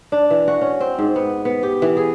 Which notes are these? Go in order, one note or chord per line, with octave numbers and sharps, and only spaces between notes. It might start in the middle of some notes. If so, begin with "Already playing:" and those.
D4
E3
F#4
C#4
C4
G#2
B3
B3
G4
E3
G#4